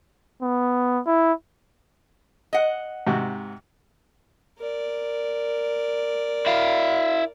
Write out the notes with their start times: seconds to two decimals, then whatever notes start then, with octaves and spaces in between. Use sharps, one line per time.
0.42 B3
1.06 E4
2.53 D#5 F#5
3.07 G#2 C3 F#4
4.58 A#4 D5
6.46 E4 F5